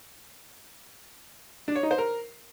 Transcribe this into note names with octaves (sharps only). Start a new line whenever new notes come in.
D4
C#5
D#4
C5
A#4